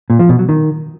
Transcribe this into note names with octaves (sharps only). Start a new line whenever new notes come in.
A#2
F3
B2
F#3
D#3